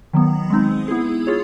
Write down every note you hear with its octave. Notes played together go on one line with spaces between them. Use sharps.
D#3 F#3 B3
G#3 C4 D#4
B3 E4 G#4
F4 G#4 C#5